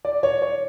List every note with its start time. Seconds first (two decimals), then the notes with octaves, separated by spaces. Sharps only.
0.05 D5
0.23 C#5
0.42 C#5